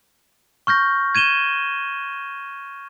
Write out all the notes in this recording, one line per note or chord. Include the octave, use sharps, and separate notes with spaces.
C#6 F6 G6 A#6
G#6 D#7 E7 G7